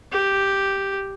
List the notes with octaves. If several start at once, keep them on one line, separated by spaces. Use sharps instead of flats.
G4